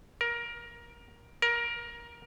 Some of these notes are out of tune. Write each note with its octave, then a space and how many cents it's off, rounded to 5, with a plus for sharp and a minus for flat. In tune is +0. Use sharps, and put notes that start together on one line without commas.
A#4 +20
A#4 +20